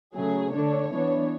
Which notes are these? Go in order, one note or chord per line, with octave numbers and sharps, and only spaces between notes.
C#3 F#3 A3 G#4
D3 A3 D4 C#5
E3 B3 D4